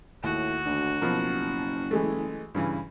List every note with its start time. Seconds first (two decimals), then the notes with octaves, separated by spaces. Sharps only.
0.23 D#2 A2 F#4
0.65 D2
1.01 F#1 B2 F3 A#4
1.91 E3 G#3 A3
2.55 G2 C#3 E3